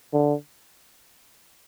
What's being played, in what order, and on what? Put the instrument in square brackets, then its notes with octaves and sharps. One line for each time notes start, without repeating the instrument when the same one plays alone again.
[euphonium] D3